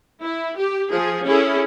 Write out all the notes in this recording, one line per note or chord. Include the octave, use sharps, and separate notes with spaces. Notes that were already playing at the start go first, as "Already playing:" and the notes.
E4
G4
F3 G#4
C#4 E4 G#4 A4